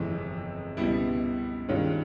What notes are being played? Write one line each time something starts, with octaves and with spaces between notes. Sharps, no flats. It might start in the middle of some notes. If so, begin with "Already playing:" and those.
Already playing: G1 F2 C3 E3 G#3
C#2 B2 G3 B3 E4
G2 D#3 G#3 C#4 F4